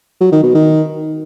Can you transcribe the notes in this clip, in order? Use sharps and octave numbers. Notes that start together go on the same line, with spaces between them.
F#3
D#3
B2
D#3